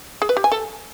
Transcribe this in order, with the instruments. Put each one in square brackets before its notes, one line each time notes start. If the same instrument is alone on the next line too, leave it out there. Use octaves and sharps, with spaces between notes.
[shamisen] G#4
B4
G4
G#5
A4